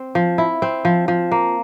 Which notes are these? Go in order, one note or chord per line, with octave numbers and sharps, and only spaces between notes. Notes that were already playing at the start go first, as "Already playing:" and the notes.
Already playing: C4
F3
E4
C4
F3
F3
A#3